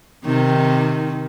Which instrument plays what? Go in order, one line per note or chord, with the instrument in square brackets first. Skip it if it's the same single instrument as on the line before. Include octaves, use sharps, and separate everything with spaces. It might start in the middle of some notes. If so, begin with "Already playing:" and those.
[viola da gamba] C3 D#3